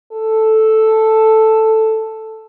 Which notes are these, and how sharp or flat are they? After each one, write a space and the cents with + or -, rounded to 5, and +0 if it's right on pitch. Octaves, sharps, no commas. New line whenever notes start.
A4 +0